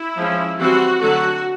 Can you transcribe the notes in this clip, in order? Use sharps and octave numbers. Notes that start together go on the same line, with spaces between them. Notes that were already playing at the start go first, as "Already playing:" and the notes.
Already playing: E4
F3 G#3 C#4
E3 G3 C4 F#4
D3 F#3 A3 F#4